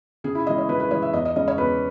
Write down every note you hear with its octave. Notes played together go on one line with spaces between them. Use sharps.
C#3 G#4
E4
E3 G#3 D#5
C#5
C#3 B4
B4
E3 G#3 C#5
E5
E2 D#5
D#5
C#3 G#3 C#4 D#5
C#5
E2 B4